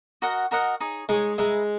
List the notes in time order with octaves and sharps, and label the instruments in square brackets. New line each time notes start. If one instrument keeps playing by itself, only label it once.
[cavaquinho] F#4 A#4 D#5 F#5
F#4 A#4 D#5 F#5
D#4 G#4 C#5
[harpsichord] G#3 [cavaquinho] D#4 G#4 C#5
[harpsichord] G#3 [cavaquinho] G#4 B4 E5 A#5